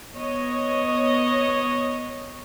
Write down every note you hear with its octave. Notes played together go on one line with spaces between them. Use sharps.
B3 C#5 D#5